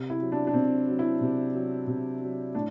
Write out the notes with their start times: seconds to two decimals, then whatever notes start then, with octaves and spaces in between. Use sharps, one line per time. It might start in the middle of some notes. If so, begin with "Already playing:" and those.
Already playing: C3
0.10 E4
0.20 F#3
0.32 D4
0.47 D4
0.54 C3 C4
0.88 F#3
0.99 E4
1.21 C3
1.54 F#3
1.87 C3
2.22 F#3
2.55 A2 D4